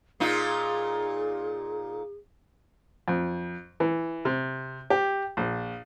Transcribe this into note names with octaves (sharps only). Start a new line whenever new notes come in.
A#2 D#4 F4 G#4
F2
E3
C3
G4
A#1